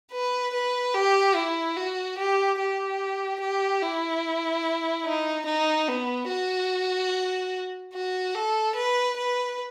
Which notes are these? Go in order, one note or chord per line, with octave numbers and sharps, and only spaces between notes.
B4
B4
G4
E4
F#4
G4
G4
G4
E4
D#4
D#4
B3
F#4
F#4
A4
B4
B4